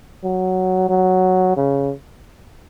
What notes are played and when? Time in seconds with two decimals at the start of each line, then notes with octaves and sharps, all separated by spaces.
0.24 F#3
0.89 F#3
1.57 C#3